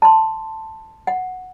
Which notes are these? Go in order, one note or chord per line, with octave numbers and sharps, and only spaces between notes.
A5 C6
F#5